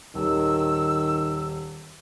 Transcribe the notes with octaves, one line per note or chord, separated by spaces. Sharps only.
D#1 D#3 E6